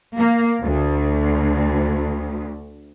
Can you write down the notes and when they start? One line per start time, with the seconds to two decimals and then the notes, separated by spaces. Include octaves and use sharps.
0.18 A#3
0.62 D2